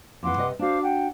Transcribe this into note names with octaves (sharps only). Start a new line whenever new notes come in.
F2 E3 B4 F#5 C6 D6
C3 B4 D#5
D4 F#4 C5 F5 D6
F#5 G5